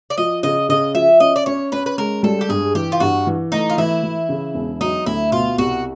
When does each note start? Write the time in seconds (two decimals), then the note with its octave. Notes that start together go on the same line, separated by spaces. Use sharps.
0.10 D5
0.18 F3 D#5
0.43 C#3 D#5
0.69 C#3 D#5
0.95 F3 E5
1.20 C#4 D#5
1.36 D5
1.46 C#4 C#5
1.72 C#4 B4
1.86 B4
1.98 G#3 A#4
2.23 G3 A4
2.41 G4
2.49 G2 G#4
2.75 E3 G4
2.92 F4
3.00 G2 F#4
3.27 E3
3.52 A3 D#4
3.70 F4
3.78 E3 E4
4.03 E3
4.29 C#3
4.55 E1
4.81 F#3 D#4
5.06 D2 E4
5.32 B2 F4
5.58 C2 F#4